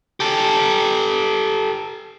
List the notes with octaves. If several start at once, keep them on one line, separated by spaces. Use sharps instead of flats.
G4 A4